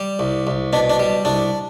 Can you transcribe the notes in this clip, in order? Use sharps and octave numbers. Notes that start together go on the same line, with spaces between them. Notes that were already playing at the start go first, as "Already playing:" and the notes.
Already playing: G3
C2
C2
B2 D4
D4
G3
C2 D4